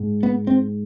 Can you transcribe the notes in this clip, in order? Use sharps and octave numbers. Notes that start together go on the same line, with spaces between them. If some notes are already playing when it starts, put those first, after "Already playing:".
Already playing: G#2
B3
C4